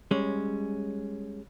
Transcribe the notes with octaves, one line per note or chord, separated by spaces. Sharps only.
G3 G#3 C#4